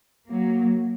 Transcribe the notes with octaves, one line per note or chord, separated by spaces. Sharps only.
F#3 A#3